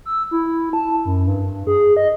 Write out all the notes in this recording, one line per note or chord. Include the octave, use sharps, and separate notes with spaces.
E6
E4
A5
F#2
G2
G#4
D#5